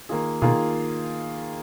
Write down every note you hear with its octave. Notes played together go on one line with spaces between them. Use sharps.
D#3 A#3 F4 G#4
B2 D#3 A#3 F4 G#4